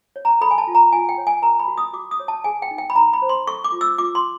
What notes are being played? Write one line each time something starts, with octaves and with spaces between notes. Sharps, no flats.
C#5
A#5
A4 B5
G#5
A5
F4
A#5
F4 G#5
G5
C#5
G#5
A#4 A#5
B5
F#4
D#6
F#4 D6
D#6
C#5
A5
G#4 G#5
G5
D#4
G5
B5
D#4 A#5
B5
C5
C6
A4 C#6
D6
F4
E6
F4 D6
C6